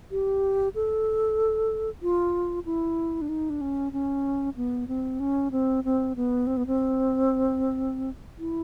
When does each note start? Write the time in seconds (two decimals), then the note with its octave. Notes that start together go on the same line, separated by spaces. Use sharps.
0.12 G4
0.75 A4
2.02 F4
2.65 E4
3.22 D4
3.29 D#4
3.50 D4
3.61 C#4
3.92 C#4
4.56 B3
4.88 C4
5.20 C#4
5.51 C4
5.84 C4
6.16 B3
6.47 C4
6.57 B3
6.67 C4
8.38 E4